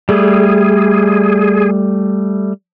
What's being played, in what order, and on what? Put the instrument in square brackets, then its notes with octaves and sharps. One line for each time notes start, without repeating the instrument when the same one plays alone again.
[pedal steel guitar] G3 A3 [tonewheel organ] G#4